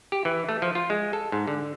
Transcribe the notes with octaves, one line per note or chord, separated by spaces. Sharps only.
G4
E3
A3
F3
F4
G#3
A4
G#2
D3